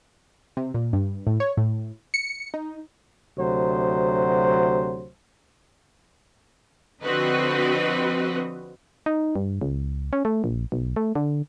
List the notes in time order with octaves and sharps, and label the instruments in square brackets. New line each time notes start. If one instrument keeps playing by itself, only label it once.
[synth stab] C3
A#2
G2
A2
C#5
A2
C#7
D#4
[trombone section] D2 C3 F#3 C5
[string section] D3 F3 C4 F#4 B4 D#5
[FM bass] D#4
G2
C#2
C#4
A3
A#1
B1
A3
D3